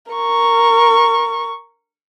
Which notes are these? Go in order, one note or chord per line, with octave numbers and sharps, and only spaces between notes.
A#4 C#6